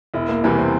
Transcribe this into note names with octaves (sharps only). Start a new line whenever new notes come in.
E1 E4
A#3
E2 C3 E3 G3 E4
C4